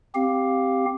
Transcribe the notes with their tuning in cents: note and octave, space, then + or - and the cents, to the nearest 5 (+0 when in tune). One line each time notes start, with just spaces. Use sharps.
C4 +0 G4 +0 F5 +10